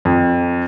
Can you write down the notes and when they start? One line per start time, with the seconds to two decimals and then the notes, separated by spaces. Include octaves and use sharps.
0.05 F2